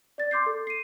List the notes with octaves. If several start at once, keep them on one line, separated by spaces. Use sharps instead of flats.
D5 A6
C6 D6 G6 C7
A4
C7 D#7